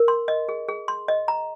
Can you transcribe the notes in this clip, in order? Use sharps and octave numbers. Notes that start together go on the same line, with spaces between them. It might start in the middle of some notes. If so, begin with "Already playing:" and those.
Already playing: A#4
C6
D#5
G#4
G#4
C6
D#5
A#5